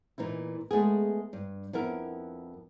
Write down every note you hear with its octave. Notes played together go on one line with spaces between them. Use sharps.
A#2 E3 D#4 E4
G#3 A3 B3 G#4
G2
F2 B3 E4 A#4